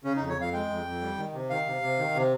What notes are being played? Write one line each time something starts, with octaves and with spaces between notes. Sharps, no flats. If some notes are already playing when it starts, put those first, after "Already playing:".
C#3 C#4
D#4
F2
C#5
F2 F5
G#3 G5
F2
F2
G3
D#3
C3
D#3 F5
C3
C3
D#3
C3